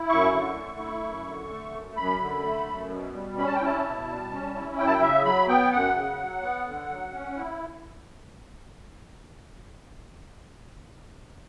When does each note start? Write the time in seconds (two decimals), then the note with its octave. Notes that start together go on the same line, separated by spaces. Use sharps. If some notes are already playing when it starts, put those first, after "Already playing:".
Already playing: E4
0.09 F#2 C#6
0.32 D3
0.56 A3
0.79 E4
1.03 F#2
1.26 D3
1.50 A3
1.73 F#2
1.97 F#2 B5
2.21 D3
2.44 A3
2.67 F#2
2.90 B2
3.14 G3
3.37 C#4 B5
3.47 A5
3.56 G5
3.61 E4 A5
3.85 B2
4.08 G3
4.32 C#4
4.55 E4
4.78 F#2 G5
4.86 A5
4.93 G5
5.01 C#3 E5
5.25 F#3 B5
5.49 B3 G5
5.72 F#2 F#5
5.95 C#3
6.19 F#3
6.42 B3
6.66 D3
6.90 F#3
7.13 C#4
7.37 E4